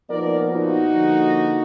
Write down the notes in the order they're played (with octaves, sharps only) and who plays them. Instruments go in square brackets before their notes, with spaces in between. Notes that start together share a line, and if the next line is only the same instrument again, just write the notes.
[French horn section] A#2 F3 B3 D#4 A#4 D5
D#4 F#4
D3 F3 A#3